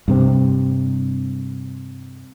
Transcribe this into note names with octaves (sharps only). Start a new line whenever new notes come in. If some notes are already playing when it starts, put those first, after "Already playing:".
G2 C3 C4